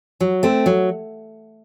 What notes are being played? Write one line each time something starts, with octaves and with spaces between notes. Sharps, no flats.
F#3
A3 C4
F#3